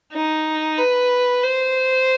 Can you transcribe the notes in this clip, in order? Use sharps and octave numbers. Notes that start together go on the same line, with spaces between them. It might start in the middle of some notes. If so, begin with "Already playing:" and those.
D#4
B4
C5